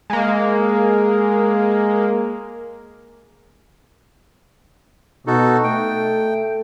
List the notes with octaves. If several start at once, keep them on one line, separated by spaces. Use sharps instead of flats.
G#3 A#3
B2 D#4 F#4 A4
A3 G5